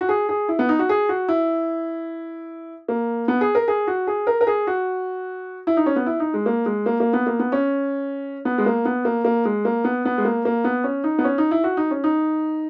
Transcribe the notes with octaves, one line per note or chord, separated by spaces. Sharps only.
F#4
G#4
G#4
E4
B3
D#4
F#4
G#4
F#4
E4
A#3
B3
G#4
A#4
G#4
F#4
G#4
A#4
A#4
G#4
F#4
E4
D#4
C#4
B3
E4
D#4
G#3
A#3
G#3
A#3
A#3
B3
A#3
B3
C#4
B3
G#3
A#3
B3
A#3
A#3
G#3
A#3
B3
B3
G#3
A#3
A#3
B3
C#4
D#4
B3
C#4
D#4
E4
F#4
D#4
C#4
D#4